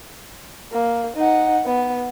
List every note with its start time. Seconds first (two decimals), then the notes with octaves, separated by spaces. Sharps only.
0.72 A#3
1.16 D#4 F#5
1.66 B3